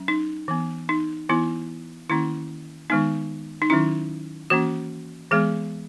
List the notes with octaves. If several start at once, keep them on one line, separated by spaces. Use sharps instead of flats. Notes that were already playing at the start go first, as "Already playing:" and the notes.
Already playing: F#3 C#4
D#4
E3 B3
D#4
E3 B3 E4
D#3 A#3 C#4 E4
D#3 G#3 B3 D#4
D#4
D#3 F#3 C#4 E4
E3 A#3 C#4 F#4
E3 G#3 B3 G#4